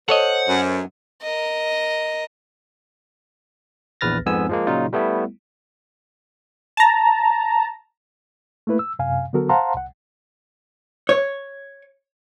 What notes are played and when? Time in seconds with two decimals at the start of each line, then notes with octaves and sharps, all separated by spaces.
0.09 A4 C5 C#5 D#5 F#5
0.49 F#2
1.22 A#4 D#5
4.01 A#1 E2 B4 F6 A6 A#6
4.26 F2 G#2 B3 G#5 E6
4.49 F3 G#3 A#3
4.67 A#2 C#3 F#3 D#4 F4
4.93 G3 A3 B3 E4
6.77 A5 A#5
8.67 A3 A#3 E4 B4
8.79 E6
8.99 F#2 C3 F5 G#5
9.33 D3 F#3 B3 F#4 A4 A#4
9.49 C5 F5 F#5 A5 A#5 C6
9.75 C2 F#5
11.09 C#5